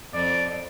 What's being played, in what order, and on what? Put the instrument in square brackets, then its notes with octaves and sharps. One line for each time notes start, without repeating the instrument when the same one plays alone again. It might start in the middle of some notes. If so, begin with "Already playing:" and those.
[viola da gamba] F2 F3 [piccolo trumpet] D5